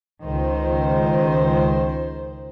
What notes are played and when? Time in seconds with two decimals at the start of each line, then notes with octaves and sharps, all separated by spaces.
0.24 C#2 D#3 C5